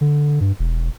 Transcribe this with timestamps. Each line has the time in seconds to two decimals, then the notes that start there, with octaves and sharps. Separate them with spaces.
0.01 D3
0.41 G2
0.59 E1